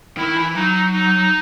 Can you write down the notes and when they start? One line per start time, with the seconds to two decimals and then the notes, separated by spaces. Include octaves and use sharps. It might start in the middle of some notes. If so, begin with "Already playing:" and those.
0.17 D#3 E4
0.36 E3
0.55 F#3 D#4
0.93 D#4